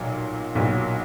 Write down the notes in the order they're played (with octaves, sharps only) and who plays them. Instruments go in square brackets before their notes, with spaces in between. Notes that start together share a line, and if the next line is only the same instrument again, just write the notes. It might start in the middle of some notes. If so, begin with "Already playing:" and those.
Already playing: [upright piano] B1 A#2 F#3
B1 A#2 F#3